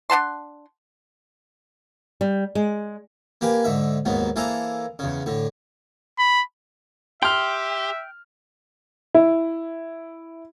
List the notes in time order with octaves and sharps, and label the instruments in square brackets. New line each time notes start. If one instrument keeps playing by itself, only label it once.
[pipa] D4 F#5 A5 C6
[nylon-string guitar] G3
G#3
[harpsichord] A#3 G4 B4 G#5
G#2 D3 E5
D#2 G#2 F#3 B3
E3 A#3 G#4 A4 C5 A#5
E2 C#3
A2 D3
[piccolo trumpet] B5
[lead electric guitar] G4 [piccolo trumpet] E5 [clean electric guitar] G5 [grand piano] C6 F6
[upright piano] E4